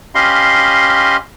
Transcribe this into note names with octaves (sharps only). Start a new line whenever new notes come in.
C#4 G4 D#5 F5 B5 C6